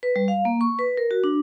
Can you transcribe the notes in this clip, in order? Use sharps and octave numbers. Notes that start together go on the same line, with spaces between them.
B4
G3
F5
A#3
C#6
B4
A#4
F#4
D4